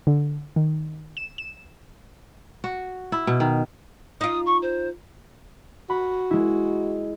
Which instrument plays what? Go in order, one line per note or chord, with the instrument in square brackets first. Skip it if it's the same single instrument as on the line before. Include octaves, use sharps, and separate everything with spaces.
[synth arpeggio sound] D3
D#3
E7
E7
[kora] F#4
E4
B2
D#3
[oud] D#4 F4 [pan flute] D#6
[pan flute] C#6
C5
[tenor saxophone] F#4 [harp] B5
[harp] G#3 E4